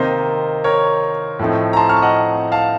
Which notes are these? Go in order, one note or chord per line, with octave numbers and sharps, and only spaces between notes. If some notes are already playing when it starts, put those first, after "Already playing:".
Already playing: C3 D#3 A#3 D#4 C5 D#5
A#4 C#5
A2 F3 A3 C4 D#4
A#5
A5 C6
C#6 F6
A5
D#5 F#5
F5 A5